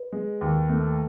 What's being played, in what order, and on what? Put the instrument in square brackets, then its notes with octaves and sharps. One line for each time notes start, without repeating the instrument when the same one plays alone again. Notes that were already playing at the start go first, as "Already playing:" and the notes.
Already playing: [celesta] B4
[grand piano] G#3
D#2
A3